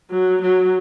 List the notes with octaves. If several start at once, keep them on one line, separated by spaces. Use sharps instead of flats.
F#3
F#3